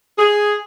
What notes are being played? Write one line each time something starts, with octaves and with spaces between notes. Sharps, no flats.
G#4